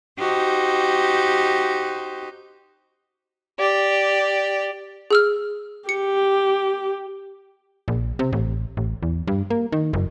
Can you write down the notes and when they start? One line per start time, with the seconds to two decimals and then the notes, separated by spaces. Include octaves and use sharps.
0.17 D#4 F#4 G4 C5
3.59 G4 D5
5.11 G#4 E6 F6
5.89 G4 C#7
7.88 A#1
8.19 C3
8.33 A1
8.77 A1
9.03 E2
9.27 G2
9.50 A#3
9.72 D#3
9.93 F#1